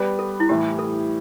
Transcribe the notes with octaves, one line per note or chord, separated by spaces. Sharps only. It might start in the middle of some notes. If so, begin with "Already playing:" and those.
Already playing: G3 B3 G4 B4 D5
A4
E4
A2 E3 G3 G4
A4